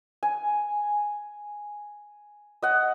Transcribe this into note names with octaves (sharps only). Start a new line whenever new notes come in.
G#5
D#5 F#5